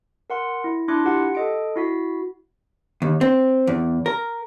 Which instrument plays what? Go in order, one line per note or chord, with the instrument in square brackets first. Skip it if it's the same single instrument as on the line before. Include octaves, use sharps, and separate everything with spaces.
[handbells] A#4 F#5 C6
E4
D4 E4 C6 D6 F#6
F4 G4 F#5
A4 D#5 D7
E4 F#4 B6
[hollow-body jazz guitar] D#2
C4
E2
A#4